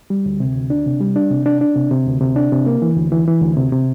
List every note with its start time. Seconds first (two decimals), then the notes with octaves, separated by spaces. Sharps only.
0.10 G3
0.26 D2
0.40 C3
0.55 D2
0.70 D4
0.86 C3
1.00 G3
1.16 D4
1.31 C3
1.46 D4
1.61 D4
1.76 C3
1.91 C3
2.06 D2
2.21 C3
2.36 D4
2.52 C3
2.66 A#3
2.82 E3
2.97 D2
3.12 E3
3.27 E3
3.42 D2
3.57 C3
3.72 C3